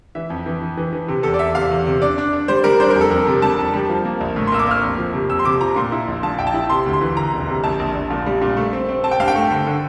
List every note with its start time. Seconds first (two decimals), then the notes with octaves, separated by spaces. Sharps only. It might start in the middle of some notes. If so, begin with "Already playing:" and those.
0.15 E3 E5
0.30 F2
0.46 E3
0.62 E3
0.77 E3
0.93 E3
1.08 C3
1.23 E2 A4
1.34 D5
1.39 E2 E5
1.55 C3 F5
1.71 E2
1.86 C3
2.02 D4 D5
2.18 D4
2.33 D4
2.48 G3 C5
2.64 G3 A#4
2.80 D4 C5
2.90 A#4
2.95 F2
3.01 A4
3.11 F2 A#4
3.27 C3
3.42 G3 A5
3.58 F2
3.74 G3
3.89 F3
4.05 A#3
4.20 A#1
4.36 A2
4.47 C6
4.52 A#3 E6
4.59 D6
4.67 A#3 F6
4.83 F2
4.98 F3
5.14 C3
5.29 F2 E6
5.39 C6
5.45 C3 D6
5.61 F3 A#5
5.76 A#2 C6
5.92 E4
6.08 A#1
6.23 A#2 A5
6.38 A#1 G5
6.47 A5
6.54 E4
6.70 C3 C6
6.86 D2
6.93 C6
7.01 E3
7.17 D2 A#5
7.32 E1
7.48 C3
7.63 A#1 A5
7.79 A#1
7.95 A#1
8.10 A#2
8.26 G3
8.41 A#2
8.57 A3
8.73 C4
8.89 C4
9.04 C4 A5
9.11 G5
9.20 G2 F5
9.28 G5
9.35 A3
9.51 D3
9.67 D3